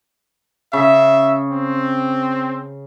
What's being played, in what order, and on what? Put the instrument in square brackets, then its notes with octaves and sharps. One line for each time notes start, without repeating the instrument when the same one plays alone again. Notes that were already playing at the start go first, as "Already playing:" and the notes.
[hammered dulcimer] C#3 [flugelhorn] E5
[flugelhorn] C4